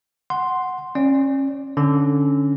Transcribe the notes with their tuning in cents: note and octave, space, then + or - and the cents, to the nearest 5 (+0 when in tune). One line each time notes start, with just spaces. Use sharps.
F#5 +0 C6 +0
C#4 -30 D5 +0
D3 +0 C#4 +0